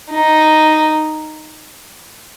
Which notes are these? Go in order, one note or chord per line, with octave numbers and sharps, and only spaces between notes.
D#4